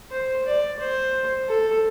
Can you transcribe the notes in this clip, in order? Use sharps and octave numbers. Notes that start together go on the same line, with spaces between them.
C5
D5
C5
A4